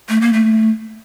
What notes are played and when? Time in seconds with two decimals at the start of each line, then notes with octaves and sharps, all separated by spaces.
0.09 A3
0.21 A#3
0.33 A3